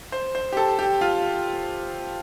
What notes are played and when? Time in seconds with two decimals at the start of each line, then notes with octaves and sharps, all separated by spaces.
0.12 C5
0.35 C5
0.52 G4
0.57 A4
0.79 G4
1.01 F4